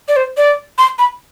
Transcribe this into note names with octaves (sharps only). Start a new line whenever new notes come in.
D5
C5
D5
C6
B5